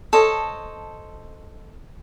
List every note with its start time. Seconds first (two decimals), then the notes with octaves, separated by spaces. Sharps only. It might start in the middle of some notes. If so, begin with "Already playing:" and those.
0.13 A4 C5 C#5 D#5